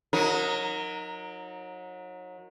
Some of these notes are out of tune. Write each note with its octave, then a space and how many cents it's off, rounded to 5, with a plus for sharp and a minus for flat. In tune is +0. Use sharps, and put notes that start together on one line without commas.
F#3 -30 D#4 +0 A#4 -10